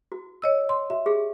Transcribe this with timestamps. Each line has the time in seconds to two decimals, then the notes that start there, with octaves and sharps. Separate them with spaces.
0.12 F#4
0.42 C#5 D#5 E6
0.69 C6
0.90 F#4 E5
1.06 G4 G#4 F5